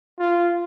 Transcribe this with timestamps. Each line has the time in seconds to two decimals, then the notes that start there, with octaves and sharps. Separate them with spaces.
0.19 F4